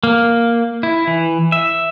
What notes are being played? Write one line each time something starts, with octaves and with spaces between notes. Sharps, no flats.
A#3
E4
E3
E5